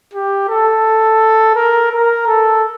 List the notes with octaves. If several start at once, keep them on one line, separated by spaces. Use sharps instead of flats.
G4
A4
A#4
A#4
A4